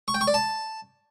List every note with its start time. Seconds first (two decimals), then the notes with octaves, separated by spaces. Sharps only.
0.08 C#6
0.14 G5
0.21 C#6
0.28 D5
0.34 A5